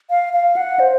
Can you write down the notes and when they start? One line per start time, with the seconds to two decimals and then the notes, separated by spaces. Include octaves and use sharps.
0.10 F5
0.33 F5
0.57 F#5
0.79 C5